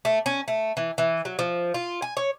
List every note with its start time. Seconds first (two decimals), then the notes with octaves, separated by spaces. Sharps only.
0.05 A3
0.26 C#4
0.48 A3
0.77 E3
0.98 E3
1.25 F#3
1.39 F3
1.74 F4
2.02 G#5
2.17 C#5